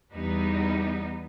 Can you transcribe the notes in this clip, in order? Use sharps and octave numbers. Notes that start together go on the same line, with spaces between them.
E2 G3 B3 D#4